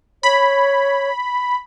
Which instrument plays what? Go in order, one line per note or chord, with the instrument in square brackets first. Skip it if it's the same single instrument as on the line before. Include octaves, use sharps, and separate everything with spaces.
[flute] C#5 [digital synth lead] B5